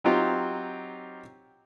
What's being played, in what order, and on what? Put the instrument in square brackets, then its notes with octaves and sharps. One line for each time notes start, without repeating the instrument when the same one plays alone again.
[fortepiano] F#3 C4 D#4 F4 G4